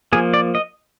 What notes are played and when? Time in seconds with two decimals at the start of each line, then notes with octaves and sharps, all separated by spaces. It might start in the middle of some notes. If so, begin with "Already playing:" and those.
0.13 F3 A#3 G#4
0.34 D5
0.55 D#5